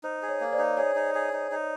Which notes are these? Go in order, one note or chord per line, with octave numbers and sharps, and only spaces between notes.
D#4 C5
G#4
C#5
A#3
C5 D5
D#4
G#4 C#5
D#4
G#4
D#4
D#4